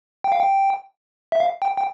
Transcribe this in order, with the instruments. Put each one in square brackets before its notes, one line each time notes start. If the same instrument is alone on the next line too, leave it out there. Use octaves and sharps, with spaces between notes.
[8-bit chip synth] G5
F5
G5
E5
F5
G5
G5